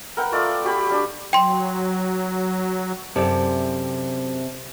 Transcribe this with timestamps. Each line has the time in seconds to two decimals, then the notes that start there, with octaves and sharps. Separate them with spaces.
0.17 A#4 B4 F#5 G5
0.32 A3 F4 D5 D6
0.64 F#4 G4 B5
0.89 G3 D4
1.33 F#3 G5 C6
3.16 F#2 C3 G4 A4 C5 D5 A5